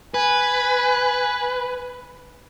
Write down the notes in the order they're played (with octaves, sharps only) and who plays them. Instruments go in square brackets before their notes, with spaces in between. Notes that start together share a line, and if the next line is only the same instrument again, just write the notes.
[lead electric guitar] B4 [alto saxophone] G#5